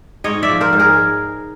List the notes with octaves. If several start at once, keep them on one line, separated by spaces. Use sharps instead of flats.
G#2 C#5 D#5
D5 E5
F3
A#4 C5
G#2
G#4 A#4